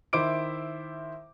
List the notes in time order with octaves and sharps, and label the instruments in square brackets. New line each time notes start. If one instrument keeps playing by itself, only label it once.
[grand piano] D#3 E4 C5 E5 D6 D7